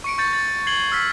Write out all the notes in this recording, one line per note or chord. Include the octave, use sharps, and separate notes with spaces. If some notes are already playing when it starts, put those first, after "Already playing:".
C#6 C#7 D7
C#6 G6 A6 C#7
A6
G#6 C7 F#7 G7
E6 F6 B6